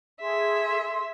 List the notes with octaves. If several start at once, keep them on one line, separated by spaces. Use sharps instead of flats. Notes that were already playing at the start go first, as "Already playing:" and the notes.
G#4 A4 E5 C6